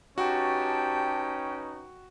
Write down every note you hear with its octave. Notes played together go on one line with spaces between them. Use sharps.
C#4 D#4 F#4 G4 B4 G5 A5